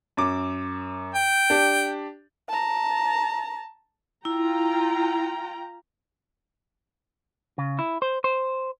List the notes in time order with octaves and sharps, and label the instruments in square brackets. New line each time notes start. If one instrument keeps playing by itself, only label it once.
[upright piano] F#2 D6
[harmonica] G5
[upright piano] D4 G4
[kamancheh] A5 A#5
[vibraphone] E4 [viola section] F4 G5 A#5
[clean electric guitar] C#3
E4
C5
C5